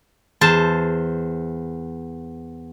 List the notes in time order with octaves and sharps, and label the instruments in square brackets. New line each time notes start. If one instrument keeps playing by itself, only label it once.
[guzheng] E2 C5 A5